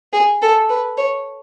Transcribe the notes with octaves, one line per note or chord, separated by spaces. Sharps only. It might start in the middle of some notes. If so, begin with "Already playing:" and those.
G#4
A4
B4
C#5